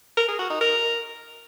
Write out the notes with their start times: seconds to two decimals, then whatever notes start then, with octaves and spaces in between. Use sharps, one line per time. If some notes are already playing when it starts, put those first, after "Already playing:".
0.17 A#4
0.28 G#4
0.39 F#4
0.50 D#4
0.61 A#4